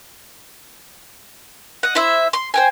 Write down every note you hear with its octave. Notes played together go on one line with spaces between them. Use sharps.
D#5 F#5
E4 C5 E5
C6
C5 G5 G#5